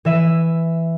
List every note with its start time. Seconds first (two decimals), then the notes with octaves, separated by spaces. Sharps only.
0.05 E3 E5 D#7